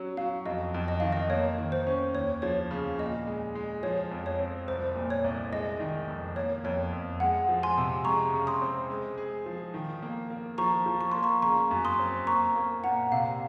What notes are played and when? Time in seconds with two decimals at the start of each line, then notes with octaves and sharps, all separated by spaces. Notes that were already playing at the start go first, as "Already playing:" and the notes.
Already playing: F#3 C#4
0.17 F#3 F5
0.45 F2 D#5
0.74 F2
0.88 D#5
1.00 D#3 F5
1.13 D#5
1.30 A#3 C#5
1.58 D#3
1.72 C5
1.87 C#4
2.15 D#2 C#5
2.42 F3 C#5
2.71 C#3
2.99 A#2 D#5
3.27 G#3
3.55 G#3
3.83 F3 C#5
4.11 F2
4.26 C#5
4.40 C4
4.67 C2 C5
4.95 A#2
5.10 C#5
5.24 C2
5.52 G#3 D#5
5.80 D#3
6.08 F2
6.36 A#3 C#5
6.64 F2 C#5
6.93 F2
7.20 G#3 F#5
7.49 F3
7.63 G#5 C6
7.78 C3
8.05 G#3 A#5 C#6
8.34 C#3
8.47 C6 D#6
8.62 C4
8.90 G#3
9.18 G#4
9.46 F3
9.74 D#3
10.02 A#3
10.30 A#3
10.58 F3 A#5 C#6
10.86 F3
11.01 C#6
11.12 A#3 C6
11.23 A#5 C#6
11.42 C#3 A#5 C#6
11.71 F#2
11.85 C6 D#6
11.99 C4
12.27 A#3 A#5 C#6
12.55 A#3
12.84 A#2 F#5 A#5
13.12 C3 F5